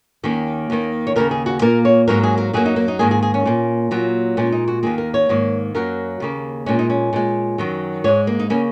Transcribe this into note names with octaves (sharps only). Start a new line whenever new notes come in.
D#2 D#3 A#3 C#4
D#2 D#3 A#3
C#5
D#2 C#3 A#3 A#4
G#4
F#4
A#2 A#3 A#4
C#5
G#2 F#3 A#3 A#4
G#4
A#4
F#2 F#3 A#3 G#4
D#4
A#3
D#4
G#2 D#3 A#3 G#4
G#4
G#4
C#4
A#2 A#3
A#2 F#3 A#3
A#2 G#3 C#4
D#4
F#4
D#2 D#3 A#3 G#4
A#4
C#5
G#2 D#3 A#3
F#2 F#3 A#3 A#4
D#2 C#3 A#3
A#2 G#3 C#4
D#4
C#4
A#2 G#3
F#2 D#3 F#3
G#2 G#3 C#5
A#3
D#4
C#3 A#3 C#4